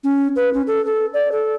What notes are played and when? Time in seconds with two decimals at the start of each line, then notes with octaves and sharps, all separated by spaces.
0.04 C#4
0.36 B4
0.53 C#4
0.67 A4
0.85 A4
1.14 D5
1.32 A4